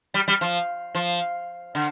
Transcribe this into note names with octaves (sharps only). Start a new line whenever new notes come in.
G3
G3
F3
F3
D3